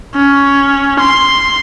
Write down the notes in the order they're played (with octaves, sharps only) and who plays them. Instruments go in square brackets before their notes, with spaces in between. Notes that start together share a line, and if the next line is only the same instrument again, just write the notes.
[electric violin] C#4
C6